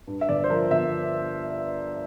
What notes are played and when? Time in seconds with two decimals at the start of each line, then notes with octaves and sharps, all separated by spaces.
0.07 G2
0.21 E5
0.29 G1 D5
0.44 C5
0.50 F3 A#4
0.71 G1 E5